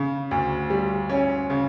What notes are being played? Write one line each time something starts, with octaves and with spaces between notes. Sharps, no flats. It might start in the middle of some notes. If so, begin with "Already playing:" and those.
Already playing: C#3
D2
G3
C#4
C#3